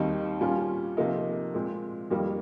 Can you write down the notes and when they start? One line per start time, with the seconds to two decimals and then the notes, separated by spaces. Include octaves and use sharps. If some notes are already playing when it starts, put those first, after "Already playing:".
Already playing: D#2 D#3 G3 C4 D#4
0.41 A#2 G3 C#4 F4
0.97 C3 F3 A#3 D#4
1.54 A#2 G#3 C4
2.11 F2 D#3 G3 A#3